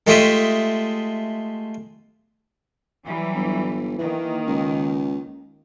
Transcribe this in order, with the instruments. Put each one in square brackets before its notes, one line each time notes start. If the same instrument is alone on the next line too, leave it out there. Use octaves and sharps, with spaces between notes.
[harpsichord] G#3 A3 F4 G4 D#5 E5
[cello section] E3 F#3 G3
[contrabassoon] G1
[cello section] D#3 A#3 [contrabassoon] E3
[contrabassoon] C#2